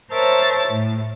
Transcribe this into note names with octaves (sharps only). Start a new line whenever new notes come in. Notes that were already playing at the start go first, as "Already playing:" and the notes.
A#4 C5 C#5 E5 A5 A6
A2